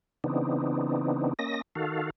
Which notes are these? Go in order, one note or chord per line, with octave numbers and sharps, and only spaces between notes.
C#3 E3 B3 C4 D4 D#4
A#3 C#4 D#5 A#6
D#3 F#4 A4 F5